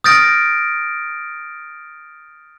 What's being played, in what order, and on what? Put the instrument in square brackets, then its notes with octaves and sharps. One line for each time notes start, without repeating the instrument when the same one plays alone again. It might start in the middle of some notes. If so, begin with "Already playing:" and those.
[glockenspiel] D#6 F6 G6 A6 A#6 D7